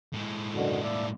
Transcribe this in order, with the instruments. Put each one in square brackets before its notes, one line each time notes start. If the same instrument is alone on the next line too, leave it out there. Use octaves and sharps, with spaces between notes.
[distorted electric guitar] A2 G#3
[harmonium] F#2 B2 D3
A#3 D5 E5